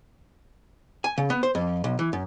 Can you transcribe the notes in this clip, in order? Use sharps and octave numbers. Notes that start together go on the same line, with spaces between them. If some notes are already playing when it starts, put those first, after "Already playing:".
G#5
C#3
B3
C5
F2
B1
E3
F#2